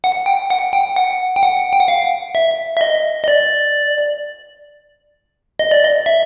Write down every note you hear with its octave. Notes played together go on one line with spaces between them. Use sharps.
F#5
G5
F#5
G5
F#5
G5
F#5
G5
F#5
F5
E5
E5
D#5
D#5
D5
D#5
D5
D#5
E5